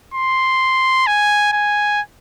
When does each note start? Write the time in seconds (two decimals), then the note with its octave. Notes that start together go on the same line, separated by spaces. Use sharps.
0.14 C6
1.07 G#5
1.53 G#5